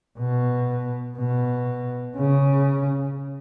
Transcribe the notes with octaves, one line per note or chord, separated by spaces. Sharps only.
B2
B2
C#3